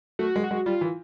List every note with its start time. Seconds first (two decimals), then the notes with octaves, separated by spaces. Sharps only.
0.19 A3 F#4
0.36 G#3
0.44 F#4
0.51 G#3
0.66 G3 F4
0.81 E3